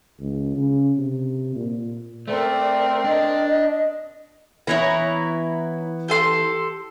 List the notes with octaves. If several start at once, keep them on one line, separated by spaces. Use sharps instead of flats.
C#2
C#3
C3
A#2
A3 C4 A#4 D5
D4 D#5
E3 B3 E4 C#5 A#5
G4 A4 C6